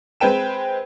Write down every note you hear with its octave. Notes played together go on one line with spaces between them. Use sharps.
G#3 C4 B4 G5 E7